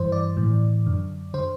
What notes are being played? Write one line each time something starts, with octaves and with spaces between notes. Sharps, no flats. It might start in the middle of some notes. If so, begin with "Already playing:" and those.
Already playing: G2 E3 C5
D5
A2 E3
F#2 D3
D3 C5